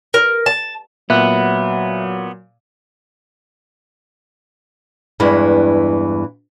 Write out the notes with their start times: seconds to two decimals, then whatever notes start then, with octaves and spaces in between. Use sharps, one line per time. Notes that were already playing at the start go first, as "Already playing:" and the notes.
0.14 A#4
0.46 A5
1.10 A#2 F#3 B3 E5 F#6
5.20 E2 G2 E3 G#3 E4